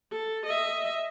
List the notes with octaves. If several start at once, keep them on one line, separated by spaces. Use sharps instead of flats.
A4
D#5 E5